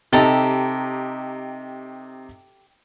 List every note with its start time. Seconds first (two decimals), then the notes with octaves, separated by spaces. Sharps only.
0.13 C3 D#4 G4 A4 A#5